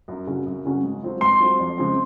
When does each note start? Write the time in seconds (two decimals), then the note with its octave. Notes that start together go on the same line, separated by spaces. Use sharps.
0.08 F#2
0.27 C#3 F#3 C#4 F#4
0.46 F#2
0.65 C#3 F#3 C#4 F#4
0.83 G#2
1.02 F#3 C4 F4
1.21 G#2 C6
1.40 F#3 C4 F4
1.59 F2
1.78 C#3 F3 G#3 C4